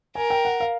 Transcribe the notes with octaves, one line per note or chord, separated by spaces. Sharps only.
A#4 G#5
G5
F#5
F5